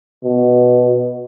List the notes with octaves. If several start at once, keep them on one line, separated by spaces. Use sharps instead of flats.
B2